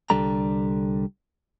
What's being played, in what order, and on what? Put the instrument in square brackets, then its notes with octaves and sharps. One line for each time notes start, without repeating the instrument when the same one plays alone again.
[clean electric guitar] C2 D3 G3 D4 A4 A#5